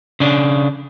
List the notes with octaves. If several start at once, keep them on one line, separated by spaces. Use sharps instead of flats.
C#3 D4